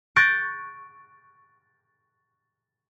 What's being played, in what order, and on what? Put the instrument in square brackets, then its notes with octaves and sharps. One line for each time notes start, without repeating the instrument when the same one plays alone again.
[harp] C#6 F#6 G6 A6 A#6 D7